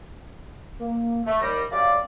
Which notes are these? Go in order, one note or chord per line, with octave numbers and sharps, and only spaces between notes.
A#3
A3
D#2 G3 A#6
F#2 G3 D5 F5